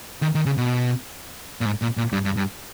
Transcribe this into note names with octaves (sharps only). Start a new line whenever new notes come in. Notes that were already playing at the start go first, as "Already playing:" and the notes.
D#3
D#3
C#3
B2
A#2
G#2
A#2
A#2
G2
G2
G2